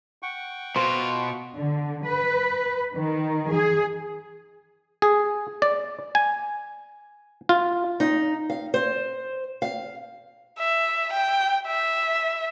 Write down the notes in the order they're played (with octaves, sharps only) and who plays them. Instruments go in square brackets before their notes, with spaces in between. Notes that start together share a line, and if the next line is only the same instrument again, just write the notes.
[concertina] F#5 G5 C#6
[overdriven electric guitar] B2 [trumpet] F4 [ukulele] C5
[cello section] D3
B4
D#3
G#4
[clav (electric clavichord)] G#4
D5
G#5
F4
[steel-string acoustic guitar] D#4
F5
C5
F5
[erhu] E5
G5
E5